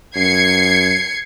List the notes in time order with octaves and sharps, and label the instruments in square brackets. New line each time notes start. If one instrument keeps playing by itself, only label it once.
[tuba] F#2 [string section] G#6 C7 C#7